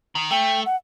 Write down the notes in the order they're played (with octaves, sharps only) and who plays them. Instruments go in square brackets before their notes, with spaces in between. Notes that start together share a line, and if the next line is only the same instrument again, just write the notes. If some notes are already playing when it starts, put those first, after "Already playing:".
[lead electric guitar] D#3
[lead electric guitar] A3 [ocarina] G5
[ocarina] F#5